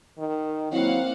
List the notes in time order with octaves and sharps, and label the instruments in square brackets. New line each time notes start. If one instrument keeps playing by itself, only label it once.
[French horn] D#3
[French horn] F#3 [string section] A#3 F5 F#5 [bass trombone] C4 [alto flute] E4